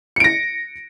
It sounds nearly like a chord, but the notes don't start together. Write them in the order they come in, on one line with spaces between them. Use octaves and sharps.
C#7 D7 A#6